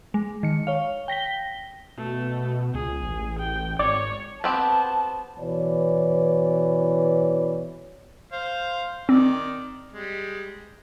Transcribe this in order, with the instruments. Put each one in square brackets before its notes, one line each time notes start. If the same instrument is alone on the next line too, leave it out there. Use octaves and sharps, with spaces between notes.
[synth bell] G#3
D#3 C#7
C#5 F5
G5 A#6 B6 G7
[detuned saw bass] B2 [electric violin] A3
[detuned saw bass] C#2 [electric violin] G#4
[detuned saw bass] A1
[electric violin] G5
[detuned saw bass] G#1 [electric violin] C#5 [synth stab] D5
[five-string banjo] B3 C4 G4 [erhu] A5
[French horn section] B2 E3 B4 C#5 D5
[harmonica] C5 F5
[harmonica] D#3 D5 [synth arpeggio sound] C4
[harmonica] G3 G#3